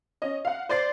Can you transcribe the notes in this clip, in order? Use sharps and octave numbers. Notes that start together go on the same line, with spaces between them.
C#4 D#5
F5 F#5
C5 D5 A6 C7